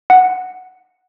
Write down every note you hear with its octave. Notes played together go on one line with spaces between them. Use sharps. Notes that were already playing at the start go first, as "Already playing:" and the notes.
F#5